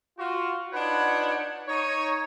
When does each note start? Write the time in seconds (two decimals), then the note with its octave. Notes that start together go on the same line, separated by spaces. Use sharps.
0.18 F4 F#4
0.72 D4 D#4 F4 B4 C#5 F#5
1.67 D#4 C#5